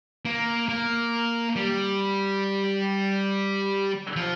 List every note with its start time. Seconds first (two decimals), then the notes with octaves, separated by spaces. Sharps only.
0.25 A#3
0.69 A#3
1.56 G3
4.16 F3